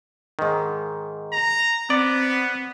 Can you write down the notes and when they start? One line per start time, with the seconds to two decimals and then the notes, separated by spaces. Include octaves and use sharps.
0.39 G#2 D#3
1.33 A#5
1.90 B3 C4 D5